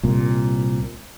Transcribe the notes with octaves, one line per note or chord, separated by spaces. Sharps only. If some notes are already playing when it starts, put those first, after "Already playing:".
C2 A#2